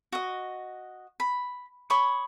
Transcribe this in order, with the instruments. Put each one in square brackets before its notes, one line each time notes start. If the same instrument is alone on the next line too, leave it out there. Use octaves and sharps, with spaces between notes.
[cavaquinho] F#4 D#5
B5
C#5 B5 C#6 D#6